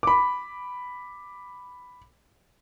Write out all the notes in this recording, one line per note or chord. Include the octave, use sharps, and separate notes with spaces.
B5 D6